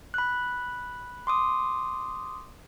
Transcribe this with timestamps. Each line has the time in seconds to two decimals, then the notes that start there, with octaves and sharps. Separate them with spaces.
0.14 B5 F#6
1.27 C6 D6 D#6